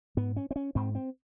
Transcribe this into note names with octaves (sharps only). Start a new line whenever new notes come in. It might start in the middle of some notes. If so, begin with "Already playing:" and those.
G#2 B3
C#4
C4
C#4
G#2 C4
C4